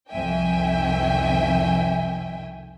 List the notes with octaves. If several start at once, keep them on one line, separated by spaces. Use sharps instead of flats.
C2 F2 D#3 E5 G5 G#5